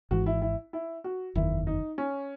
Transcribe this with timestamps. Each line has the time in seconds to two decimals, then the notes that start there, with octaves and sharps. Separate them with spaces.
0.11 G#1 G#2 E3 F#4
0.26 E4
0.42 E4
0.73 E4
1.04 F#4
1.35 F#1 E2 D#3 E4
1.67 D#4
1.98 C#4